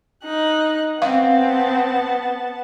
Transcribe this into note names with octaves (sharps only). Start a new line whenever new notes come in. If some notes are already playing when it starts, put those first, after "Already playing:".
D#4 F#6
B3 C4 F5 A5